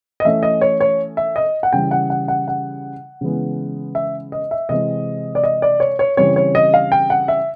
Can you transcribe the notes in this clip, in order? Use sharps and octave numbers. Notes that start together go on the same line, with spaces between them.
D#5
E3 A3 C#4 E5
D#5
C#5
C#5
E5
D#5
F#5
C#3 E3 G3 G5
F#5
F#5
F#5
F#5
C#3 E3 G#3 B3
E5
D#5
E5
C3 E3 G#3 C4 D#5
D5
D#5
D5
C#5
C#5
C#3 E3 G3 C4 C#5
C#5
D#5
F5
G5
F#5
E5